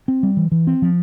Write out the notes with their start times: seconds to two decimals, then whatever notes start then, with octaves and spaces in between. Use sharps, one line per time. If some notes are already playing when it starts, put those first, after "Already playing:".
0.08 C4
0.23 G3
0.37 E3
0.52 E3
0.67 C4
0.82 F3